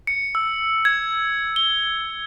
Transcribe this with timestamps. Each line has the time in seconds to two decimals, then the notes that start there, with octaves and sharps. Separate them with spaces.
0.07 C#7
0.35 E6
0.85 G#6
1.56 G7